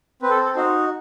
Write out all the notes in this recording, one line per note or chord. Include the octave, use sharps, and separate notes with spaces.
C4 B4
A4
A4
D#4 F#4 C5